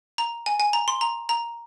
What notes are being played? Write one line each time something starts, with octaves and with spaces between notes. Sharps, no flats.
A#5
G#5
G#5
A#5
C6
A#5
A#5